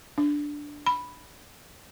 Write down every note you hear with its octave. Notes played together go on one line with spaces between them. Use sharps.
D4
B5